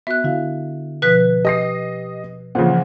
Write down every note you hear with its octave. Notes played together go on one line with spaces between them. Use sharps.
B3 F#4 E5 F#6
D3 E4 F#4 F5
B2 F3 B4 F#6 B6
G4 D#5 D#6 A#6 C7
A#2 C#3 E3 F3 G#4 C5 F#5